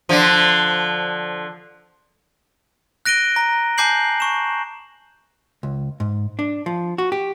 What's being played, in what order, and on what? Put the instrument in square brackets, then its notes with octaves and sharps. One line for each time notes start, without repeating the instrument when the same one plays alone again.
[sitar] D3 F3
[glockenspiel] F#6 A#6 D7 D#7 G7
A#5
G#5 A5 D6 G6 C7 F#7
C#6 E7
[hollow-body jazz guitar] C#2
G#2
D4
F3
F#4
G4